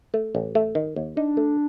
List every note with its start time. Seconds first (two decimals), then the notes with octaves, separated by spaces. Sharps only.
0.14 A3
0.35 A1
0.55 A3
0.75 D#3
0.96 D#2
1.16 D4 D#4
1.37 A3